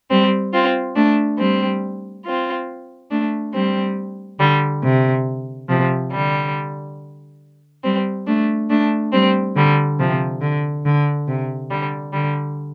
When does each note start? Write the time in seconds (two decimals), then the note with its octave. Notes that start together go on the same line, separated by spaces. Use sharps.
0.10 G3 C4
0.53 C4 F4
0.96 A3 D4
1.39 G3 C4
2.26 C4 F4
3.10 A3 D4
3.54 G3 C4
4.39 D3 G3
4.83 C3
5.69 C3 F3
6.12 D3 G3
7.83 G3 C4
8.26 A3 D4
8.69 A3 D4
9.12 G3 C4
9.56 D3 G3
9.99 C3 F3
10.41 D3
10.85 D3
11.28 C3
11.71 D3 G3
12.13 D3 G3